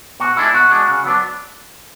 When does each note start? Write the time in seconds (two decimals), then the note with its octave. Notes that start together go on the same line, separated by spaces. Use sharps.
0.20 B2 F#4
0.37 G#3 D4 E4
0.53 B2 F#4
0.71 G#3 D4
0.87 C#3
1.04 F#3 B3 D4